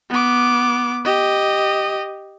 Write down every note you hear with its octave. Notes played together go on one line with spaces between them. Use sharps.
B3 D6
G4 D#5